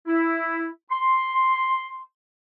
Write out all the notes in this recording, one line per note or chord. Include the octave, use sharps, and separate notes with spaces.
E4
C6